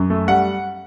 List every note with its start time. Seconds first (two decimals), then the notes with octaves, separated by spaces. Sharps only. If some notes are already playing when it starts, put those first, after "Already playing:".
Already playing: F#2
0.10 A3
0.28 G3 F#5